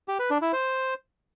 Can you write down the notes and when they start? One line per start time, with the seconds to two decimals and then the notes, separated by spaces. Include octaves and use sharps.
0.08 G4
0.19 B4
0.31 D4
0.42 E4
0.53 C5